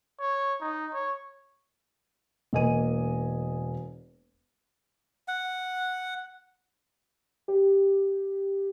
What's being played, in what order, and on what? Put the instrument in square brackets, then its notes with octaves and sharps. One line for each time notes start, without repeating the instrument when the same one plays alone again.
[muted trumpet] C#5
D#4
C#5
[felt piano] E1 A#3 D#5 G#5 D#7
[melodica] F#5
[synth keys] G4